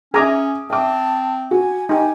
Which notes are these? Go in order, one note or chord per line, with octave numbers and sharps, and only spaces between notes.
C#4 G#4 E5 G#5 A#5 D6 D#6
C4 E5 A5 D6
F#4 G#5
D#4 G4 G#5